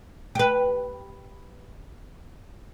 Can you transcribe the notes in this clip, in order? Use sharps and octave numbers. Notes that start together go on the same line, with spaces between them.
G4 B4